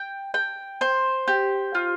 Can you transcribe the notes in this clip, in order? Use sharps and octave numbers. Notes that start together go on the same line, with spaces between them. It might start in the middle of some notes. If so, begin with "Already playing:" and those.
Already playing: G5
G5
C5
G4
F4